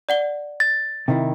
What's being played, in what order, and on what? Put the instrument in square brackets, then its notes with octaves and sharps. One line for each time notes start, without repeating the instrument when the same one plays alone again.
[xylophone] D5 F#5 G7
[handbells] A6
[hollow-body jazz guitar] C3 D#3 E4